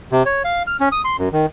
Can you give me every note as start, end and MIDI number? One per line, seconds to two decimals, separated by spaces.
0.12 0.23 48
0.26 0.43 73
0.44 0.63 77
0.67 0.77 89
0.80 0.89 61
0.92 1.02 87
1.05 1.17 84
1.19 1.29 42
1.32 1.46 51